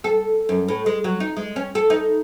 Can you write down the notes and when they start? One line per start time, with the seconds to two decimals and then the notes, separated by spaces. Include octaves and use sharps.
0.04 A4
0.49 F#2
0.68 A2
0.86 G#3
1.04 F#3
1.20 D#4
1.37 G#3
1.56 C#4
1.75 A4
1.90 D#4